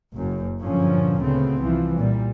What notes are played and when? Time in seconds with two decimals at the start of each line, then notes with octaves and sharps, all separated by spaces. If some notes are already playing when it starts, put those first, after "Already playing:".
0.14 F#1 F#2
0.62 G2 A#2 D3 F3 F#3 C#4
1.22 D2 C#3 A3 B3 C4
1.62 C2 E3 F3
1.98 A#2 G3